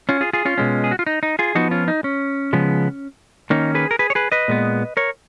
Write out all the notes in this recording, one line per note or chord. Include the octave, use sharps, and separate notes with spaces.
C#4 F4
F4 G#4
F4 G#4
C#4 F4
B2 G#3 C#4
G#4
F#4
F4
D#4
D#4
F4 G#4
F3 B3 D#4 F#4
C#4 F4
D#4
C#4
C#3 F3 G#3 B3
D#3 A#3 C#4 D#4
G#4 B4
A#4
G#4 B4
C#5
G#4 B4
B4 D#5
A#2 G#3 B3
A#4 C#5